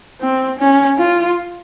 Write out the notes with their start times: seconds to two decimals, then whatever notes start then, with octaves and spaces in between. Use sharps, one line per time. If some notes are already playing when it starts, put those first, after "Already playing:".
0.21 C4
0.59 C#4
0.98 F4